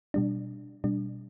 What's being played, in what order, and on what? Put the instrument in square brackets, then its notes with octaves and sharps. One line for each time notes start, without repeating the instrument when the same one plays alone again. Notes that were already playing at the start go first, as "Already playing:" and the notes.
[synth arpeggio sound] B2 G3 D4
B2 G3 D4